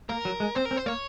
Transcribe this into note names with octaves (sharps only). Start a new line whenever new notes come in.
A#3 A#4
F#3
G#3
C4 C5
A#4
C4
C5
A#3 C#5